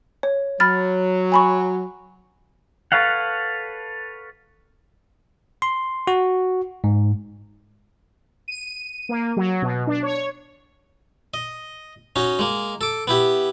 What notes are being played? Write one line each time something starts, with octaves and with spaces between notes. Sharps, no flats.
C#5
F#3 B5 F6 A6
G#5 B5 C#6
A4 B4 C#5 F5 F#5
C6
F#4
G#2
D#7
A#3
F#3
B2
D4
C#5
D#5
C#4 D#4 F#4
G#3 A#3
A4 D6
B3 E4 G4